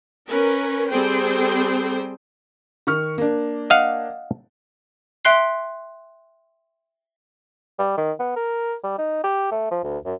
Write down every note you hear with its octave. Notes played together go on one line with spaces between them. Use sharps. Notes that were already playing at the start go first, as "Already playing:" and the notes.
C#4 A#4 B4
G3 C4 G#4 A4 C5 G5
D#3 C#6 F6
A#3 D4
D#5 F5 F#5
E5 G5 C6 F#6 C7
G3
D#3
B3
A#4
G3
D#4
G4
A3
F3
D2
F#2